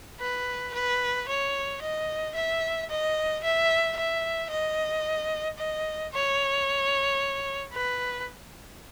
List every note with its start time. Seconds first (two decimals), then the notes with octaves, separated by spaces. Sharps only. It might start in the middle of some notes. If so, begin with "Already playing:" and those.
0.20 B4
0.74 B4
1.28 C#5
1.82 D#5
2.35 E5
2.90 D#5
3.43 E5
3.97 E5
4.50 D#5
5.58 D#5
6.13 C#5
7.74 B4